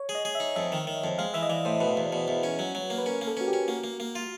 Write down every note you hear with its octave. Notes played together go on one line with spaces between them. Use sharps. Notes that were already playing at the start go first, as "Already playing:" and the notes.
Already playing: C#5
G#4
D#5
G#4
E5
D#4
F2 E5
D#3
D#3
F2
G#3 F5
E3 E5
D#5
E3 D5
A2 C5
B2 B4
E2
B2
E2
C#4
F#3
F#3
A#3
B4
C#4 A#4
A#3
A4
C#4 F#4
G4
C#4
A#3 F#4
A#3
A#3
F4